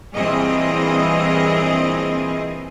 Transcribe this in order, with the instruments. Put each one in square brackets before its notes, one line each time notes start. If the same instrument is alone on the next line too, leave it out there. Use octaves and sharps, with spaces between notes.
[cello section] G2 A#2 E3 C4 G#4 D#5